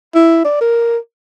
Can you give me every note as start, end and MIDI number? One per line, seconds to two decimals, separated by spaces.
0.15 0.42 64
0.45 0.60 74
0.61 0.98 70